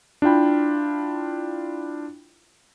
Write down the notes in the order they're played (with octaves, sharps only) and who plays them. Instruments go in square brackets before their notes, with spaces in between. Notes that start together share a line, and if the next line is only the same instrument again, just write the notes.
[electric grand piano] D4 E4 F4 G5 B5